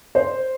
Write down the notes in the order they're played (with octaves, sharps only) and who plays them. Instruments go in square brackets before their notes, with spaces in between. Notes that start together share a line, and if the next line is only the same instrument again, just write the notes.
[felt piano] C5